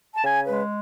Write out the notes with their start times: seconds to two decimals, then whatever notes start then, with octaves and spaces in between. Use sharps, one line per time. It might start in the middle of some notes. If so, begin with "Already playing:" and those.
0.16 A5
0.23 C#3 G#5
0.48 G#3 B4